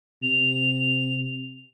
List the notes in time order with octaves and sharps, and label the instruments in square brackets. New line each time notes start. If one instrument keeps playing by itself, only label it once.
[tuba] C3 [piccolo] F7